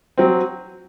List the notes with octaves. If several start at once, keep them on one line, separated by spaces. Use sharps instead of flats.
F#3 C4